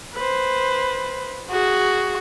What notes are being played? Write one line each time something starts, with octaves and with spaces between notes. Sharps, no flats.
B4 C5
F#4 G#4